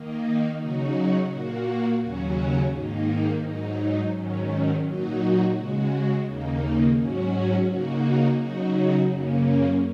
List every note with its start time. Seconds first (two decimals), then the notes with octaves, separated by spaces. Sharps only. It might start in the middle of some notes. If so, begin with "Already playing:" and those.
Already playing: D#3 A#3 D#4
0.59 C#3 F#3 D#4 F#4
1.30 A#2 A#3 F#4
2.01 D#2 C#3 F#3 C#4 F#4
2.71 G#2 D#3 A#3 D#4
3.43 G#2 F#3 D#4
4.13 G#2 D#3 F#3 C#4
4.84 A#2 F#3 D#4 F#4
5.55 C#3 G#3 F#4
6.26 D#2 C#3 A#3 D#4
6.97 G#2 F#3 C#4 F#4
7.68 C#3 A#3 D#4 F#4
8.38 C#3 F#3 D#4 F#4
9.09 F#2 C#3 A#3 C#4